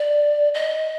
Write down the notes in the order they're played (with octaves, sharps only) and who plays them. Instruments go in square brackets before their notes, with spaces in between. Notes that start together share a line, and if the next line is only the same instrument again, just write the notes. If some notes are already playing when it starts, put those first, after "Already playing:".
Already playing: [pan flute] D5
D#5